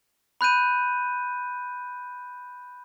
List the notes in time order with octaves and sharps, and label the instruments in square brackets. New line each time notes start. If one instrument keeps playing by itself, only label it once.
[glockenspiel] B5 F#6 G6 D#7